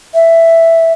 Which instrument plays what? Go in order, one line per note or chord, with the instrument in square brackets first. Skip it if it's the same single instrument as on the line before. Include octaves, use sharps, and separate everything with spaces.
[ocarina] E5